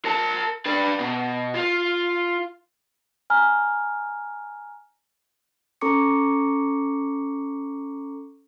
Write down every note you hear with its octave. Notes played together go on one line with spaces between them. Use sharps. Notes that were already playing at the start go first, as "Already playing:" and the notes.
A#4 A5
D4 B4
B2
F4
G#5 A#5 F6
C#4 A4 A#5 C#6 D6 C#7